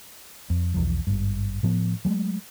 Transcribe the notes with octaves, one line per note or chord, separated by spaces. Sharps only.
F2
B1 E2 F3
G#1 G2
A2 F3 B3
F#3 G#3 A3